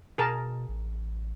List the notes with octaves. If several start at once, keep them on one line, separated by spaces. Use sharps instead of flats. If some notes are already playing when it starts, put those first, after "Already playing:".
B2 G#4 A#4 A5
A1